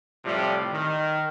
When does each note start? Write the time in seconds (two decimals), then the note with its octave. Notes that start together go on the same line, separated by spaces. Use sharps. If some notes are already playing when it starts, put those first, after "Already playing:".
0.24 A2 C3 F3 G3
0.71 D#3